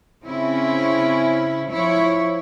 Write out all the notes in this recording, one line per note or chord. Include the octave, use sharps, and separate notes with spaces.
C#3 C4 C#4 E4
F3 E4 C#5